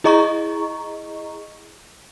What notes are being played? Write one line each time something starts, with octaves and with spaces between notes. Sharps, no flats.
E4 G#4 D#5 A#5 C#6